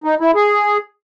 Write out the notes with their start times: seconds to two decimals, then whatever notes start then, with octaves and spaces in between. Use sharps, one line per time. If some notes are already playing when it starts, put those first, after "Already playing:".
0.04 D#4
0.21 E4
0.35 G#4